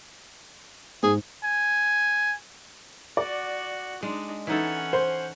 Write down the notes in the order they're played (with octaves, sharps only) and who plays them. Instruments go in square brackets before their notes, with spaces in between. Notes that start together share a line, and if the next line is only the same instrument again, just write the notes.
[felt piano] G#2 [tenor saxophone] G#4
[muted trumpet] G#5
[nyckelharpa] F#4 F#5 [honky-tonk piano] D5
[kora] G#3 [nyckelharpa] D4 D#4
[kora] E3 D#4 A4 [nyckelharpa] C#4 F#5
[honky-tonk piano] C5